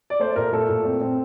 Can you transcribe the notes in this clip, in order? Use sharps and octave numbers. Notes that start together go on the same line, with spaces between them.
D5
A3 C5
A#2 A#4
A3 A4
A#2
C4
C4